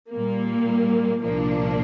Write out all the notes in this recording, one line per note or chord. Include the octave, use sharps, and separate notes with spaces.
A#2 G3 A#3
C2 A#2 F3 A#3 D4